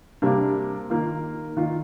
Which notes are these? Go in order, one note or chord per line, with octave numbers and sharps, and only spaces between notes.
C3 G3 A#3 D4
D#3 A#3 F4
D#3 A#3 F4